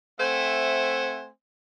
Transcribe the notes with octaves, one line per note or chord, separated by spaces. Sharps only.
A3 C4 C5 E5 F#5 G#5